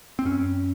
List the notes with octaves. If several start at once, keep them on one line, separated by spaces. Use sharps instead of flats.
C4
F#2 C#4